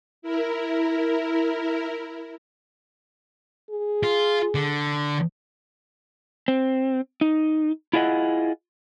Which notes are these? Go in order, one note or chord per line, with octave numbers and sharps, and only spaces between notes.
E4 A#4
G#4
F4
D3
C4
D#4
E4 F4 G#4 D#5 F#5